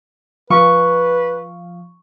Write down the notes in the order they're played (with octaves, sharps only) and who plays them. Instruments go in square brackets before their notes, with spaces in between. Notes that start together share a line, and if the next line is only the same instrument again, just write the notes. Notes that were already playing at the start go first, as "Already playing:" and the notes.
[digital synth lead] F3 [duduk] B4 [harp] C#6